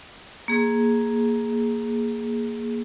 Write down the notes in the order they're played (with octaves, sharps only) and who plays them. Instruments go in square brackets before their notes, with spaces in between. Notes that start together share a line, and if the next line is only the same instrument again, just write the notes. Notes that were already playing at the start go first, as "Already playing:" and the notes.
[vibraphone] A#3 G#4